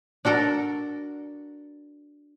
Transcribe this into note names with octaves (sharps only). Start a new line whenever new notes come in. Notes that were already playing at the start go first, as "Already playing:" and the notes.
D4 F#4 A4 A#4